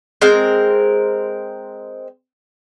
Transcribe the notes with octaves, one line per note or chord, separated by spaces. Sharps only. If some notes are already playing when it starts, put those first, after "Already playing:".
G#3 C4 A#4